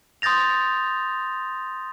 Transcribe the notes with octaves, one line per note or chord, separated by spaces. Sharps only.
C6 D#6 G6 A6 A#6 F7